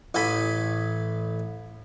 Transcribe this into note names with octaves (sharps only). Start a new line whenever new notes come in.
A1 A4 G#5 B5